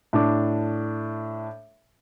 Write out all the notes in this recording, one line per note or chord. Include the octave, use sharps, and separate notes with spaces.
A2 D4 D6